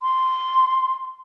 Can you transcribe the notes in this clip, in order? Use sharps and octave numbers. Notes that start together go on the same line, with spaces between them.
C6